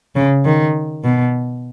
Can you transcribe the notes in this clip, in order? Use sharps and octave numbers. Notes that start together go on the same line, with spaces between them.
C#3
D#3
B2